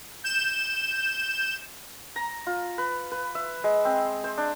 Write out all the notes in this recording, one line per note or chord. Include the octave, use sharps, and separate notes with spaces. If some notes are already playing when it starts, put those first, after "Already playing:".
G6 E7
A#5
F4
B4
B4
E5
G#3
C4
C5
D4